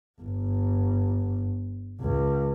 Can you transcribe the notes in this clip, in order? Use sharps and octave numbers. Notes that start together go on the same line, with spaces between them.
G1
C#2